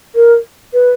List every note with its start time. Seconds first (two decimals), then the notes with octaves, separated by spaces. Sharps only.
0.15 A#4
0.73 B4